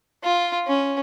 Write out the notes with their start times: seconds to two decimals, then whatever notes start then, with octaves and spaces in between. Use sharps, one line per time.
0.23 F4
0.67 C#4